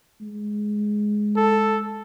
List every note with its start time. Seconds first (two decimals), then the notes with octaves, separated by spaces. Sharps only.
0.21 G#3
1.37 A4